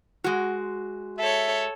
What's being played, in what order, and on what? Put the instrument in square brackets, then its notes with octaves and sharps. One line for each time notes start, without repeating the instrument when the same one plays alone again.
[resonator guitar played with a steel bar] G#3 F#4
[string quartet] A4 C#5 [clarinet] E5